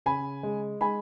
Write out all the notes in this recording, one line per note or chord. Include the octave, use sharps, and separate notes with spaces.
C#3 G#5 B5
G#3
G#3 G#5 B5